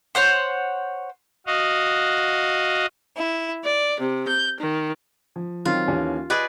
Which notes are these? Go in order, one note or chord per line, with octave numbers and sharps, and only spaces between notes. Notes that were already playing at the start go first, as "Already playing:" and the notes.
C5 C#5 F#5 C6
F#4 D#5 F5
E4
D5
C3
G6
D#3
F3
D#3 F#3 C4 F4
D#2 E3 C#4
G#4 B4 D5 D#5